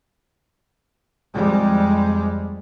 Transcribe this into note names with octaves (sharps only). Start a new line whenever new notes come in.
F2 G3 G#3